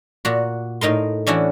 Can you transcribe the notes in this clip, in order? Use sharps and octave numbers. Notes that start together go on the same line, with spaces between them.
A#2 F#4
A2 D#4 A#4 C6
E3 C#4 D4 E4 F#4